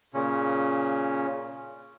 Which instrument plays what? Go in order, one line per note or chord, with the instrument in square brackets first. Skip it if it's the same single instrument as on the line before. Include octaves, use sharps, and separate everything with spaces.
[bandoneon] A#2 C#3 C#4